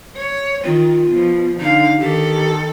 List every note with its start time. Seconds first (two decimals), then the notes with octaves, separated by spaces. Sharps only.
0.17 C#5
0.64 D#3 F4
1.07 B2 F3
1.60 D3 D#4 F5
2.00 D#3 G4 A4